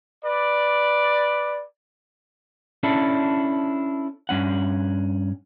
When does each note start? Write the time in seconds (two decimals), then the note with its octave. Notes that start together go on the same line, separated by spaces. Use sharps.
0.25 B4 D5
2.83 C#4 D4 E4 A4
4.29 G2 C#4 F#5